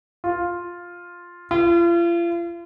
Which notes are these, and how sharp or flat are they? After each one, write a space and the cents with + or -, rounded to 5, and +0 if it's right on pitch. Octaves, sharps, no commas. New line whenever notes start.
F4 +5
F4 -40